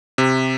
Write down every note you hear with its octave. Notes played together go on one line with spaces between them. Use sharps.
C3